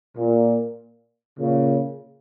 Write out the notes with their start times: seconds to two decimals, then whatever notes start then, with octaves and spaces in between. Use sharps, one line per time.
0.17 A#2
1.38 A#2 C#3